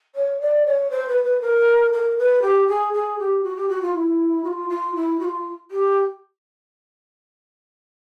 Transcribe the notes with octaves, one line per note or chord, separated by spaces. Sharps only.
C#5
D5
C#5
C5
B4
B4
A#4
A#4
B4
G4
G#4
G#4
G4
F#4
G4
F#4
F4
E4
F#4
F4
F4
E4
F#4
F4
G4